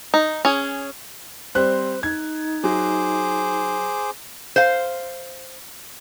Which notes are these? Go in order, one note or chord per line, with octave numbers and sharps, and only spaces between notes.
D#4
C#4 G#4
G3 C4 C5 F#6
D#4 G#6
F#3 G#4 C5 D6
C5 F5